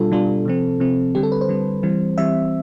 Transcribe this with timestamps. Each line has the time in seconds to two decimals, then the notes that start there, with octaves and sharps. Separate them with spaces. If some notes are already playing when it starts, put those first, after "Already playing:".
Already playing: B2 G3 D4 F4 A4
0.12 B2 G3 D4 F4
0.45 C3 F3 C4
0.80 C3 F3 C4
1.15 D3 G3 C4 G4
1.23 A4
1.32 B4
1.41 C5
1.49 D3 G3 C4
1.83 E3 G3 C4
2.18 E3 G3 C4 E5